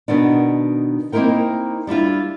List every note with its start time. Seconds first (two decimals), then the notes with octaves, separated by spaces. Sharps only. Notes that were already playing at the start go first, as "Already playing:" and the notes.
0.08 B2 D#3 B3 D4
1.12 A#3 C4 D#4 E4 A#4 G5
1.87 G3 D4 E4 F4